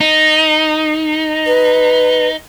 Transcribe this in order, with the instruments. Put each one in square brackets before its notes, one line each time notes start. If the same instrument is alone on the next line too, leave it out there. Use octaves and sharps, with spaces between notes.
[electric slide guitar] D#4
[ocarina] B4